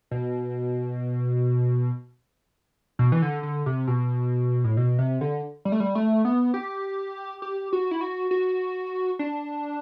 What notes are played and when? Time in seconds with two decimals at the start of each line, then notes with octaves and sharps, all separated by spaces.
0.11 B2
2.99 B2
3.12 E3
3.22 D3
3.43 D3
3.66 C3
3.87 B2
4.64 A2
4.77 B2
4.99 C3
5.21 D3
5.65 G3
5.72 A3
5.80 G3
5.95 A3
6.25 B3
6.54 G4
7.42 G4
7.73 F#4
7.91 E4
8.01 F#4
8.31 F#4
9.19 D4